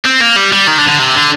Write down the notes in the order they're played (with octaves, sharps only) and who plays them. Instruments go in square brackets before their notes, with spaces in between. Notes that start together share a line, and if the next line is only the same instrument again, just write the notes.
[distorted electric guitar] C4
A#3
G3
G3
D#3
D3
D3
C3
D3